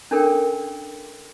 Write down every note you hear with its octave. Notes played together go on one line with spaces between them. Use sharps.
C#4 D4 A4 A#4 G5